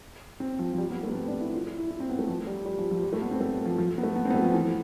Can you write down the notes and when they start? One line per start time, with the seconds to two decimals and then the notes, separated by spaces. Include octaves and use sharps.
0.40 C4
0.59 F3
0.73 F3
0.78 G3
0.90 B3
1.03 A3
1.09 B3
1.15 C4
1.28 D4
1.41 E4
1.53 F4
1.65 E4
1.78 E4
1.91 E4
2.00 C4
2.09 B3
2.19 A3
2.28 F3
2.47 G3
2.66 G3
2.78 F3
2.91 F3
3.03 G3
3.13 A3
3.22 B3
3.31 C4
3.41 A3
3.66 F3
3.78 F3
3.98 B3
4.03 A3
4.16 B3
4.25 C4
4.30 B3
4.34 A3
4.44 F3
4.53 E3